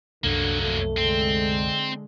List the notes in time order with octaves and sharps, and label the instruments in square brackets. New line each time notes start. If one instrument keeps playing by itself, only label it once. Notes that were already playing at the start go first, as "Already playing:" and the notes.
[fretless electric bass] C2 F#2 [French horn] D3 [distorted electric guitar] F#3 A#3
[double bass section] F2 [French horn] A3
[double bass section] D3 G#3 [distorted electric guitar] C4